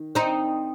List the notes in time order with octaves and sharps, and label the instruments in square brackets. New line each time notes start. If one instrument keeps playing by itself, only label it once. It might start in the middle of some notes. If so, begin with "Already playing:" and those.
Already playing: [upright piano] D#3
[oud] C4 D#4